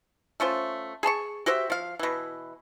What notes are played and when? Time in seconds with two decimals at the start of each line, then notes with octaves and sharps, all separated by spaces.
0.40 A3 C#4 F4 C5
1.03 G#4 A5 C6 C#6
1.46 F#4 G4 C5 E5
1.70 F3 F5
1.99 B2 E3